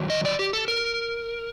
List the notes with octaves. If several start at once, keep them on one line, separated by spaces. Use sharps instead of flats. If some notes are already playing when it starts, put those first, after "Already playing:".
Already playing: G2 D#3 F#3
D#5
D5
G4
A4
A#4